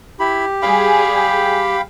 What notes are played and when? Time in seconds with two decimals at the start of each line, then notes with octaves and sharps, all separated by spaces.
0.20 E4 G4 B5
0.62 G3 G#4 F5 G5 B5